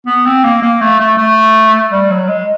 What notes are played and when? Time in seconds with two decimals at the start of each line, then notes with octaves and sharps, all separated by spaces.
0.06 B3
0.25 C4
0.44 A#3
0.62 A#3
0.81 A3
0.99 A3
1.17 A3
1.92 G3
2.10 F#3
2.28 G#3